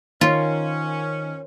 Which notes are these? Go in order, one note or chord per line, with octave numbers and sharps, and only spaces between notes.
D#3 C#4 F4 A#4 C5 C#5